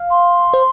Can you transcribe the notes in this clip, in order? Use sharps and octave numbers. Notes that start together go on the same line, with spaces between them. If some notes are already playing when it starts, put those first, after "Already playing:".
Already playing: F5
C6
C5